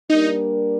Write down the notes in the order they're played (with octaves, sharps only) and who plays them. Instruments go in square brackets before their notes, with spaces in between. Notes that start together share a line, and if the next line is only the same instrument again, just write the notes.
[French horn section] G3 A#3 D4 G4 A#4 [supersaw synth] D#4